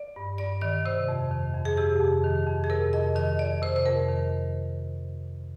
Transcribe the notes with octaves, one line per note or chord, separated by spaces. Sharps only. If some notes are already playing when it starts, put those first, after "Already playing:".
Already playing: D5
G2
G2 D5
D#3 D5
C3 C5
F2
D#3
F2
G#4
C3 G4
F2
D#3
F2
G#4
C3 A#4
F2 D#5
D#3 D#5
F2 D5
C3 C5
C5
F2 A#4
D#3